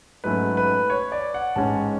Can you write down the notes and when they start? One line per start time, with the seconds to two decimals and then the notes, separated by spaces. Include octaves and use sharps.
0.24 G#2 F#3 A3 C#4 B4
0.57 B4
0.90 C#5
1.12 D5
1.34 F#5
1.56 A1 G#2 G#3 C#4 A5